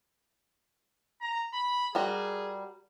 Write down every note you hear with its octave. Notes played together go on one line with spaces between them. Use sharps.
A#5
B5
G3 F#4 G#4 A#4